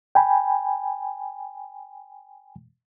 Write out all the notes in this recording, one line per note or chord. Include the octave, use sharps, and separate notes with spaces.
G5 G#5 B5